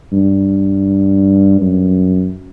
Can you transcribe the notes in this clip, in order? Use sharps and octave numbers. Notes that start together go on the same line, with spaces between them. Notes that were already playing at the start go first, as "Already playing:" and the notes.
G2
F#2